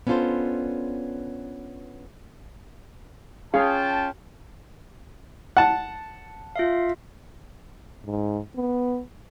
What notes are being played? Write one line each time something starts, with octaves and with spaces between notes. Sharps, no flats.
B3 C#4 D4 F4 A4 C5
C#4 F4 G#4 F5 G5 A5
F#5 A5
F4 E5 F5
G#2
B3